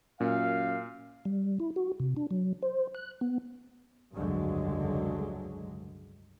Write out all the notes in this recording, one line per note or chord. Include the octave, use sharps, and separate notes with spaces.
F#2 A#2 F5
G3
E4
F#4
C3
D4
F#3
C5
F#6
B3
F1 C#2 G2 D3 F#3 G#3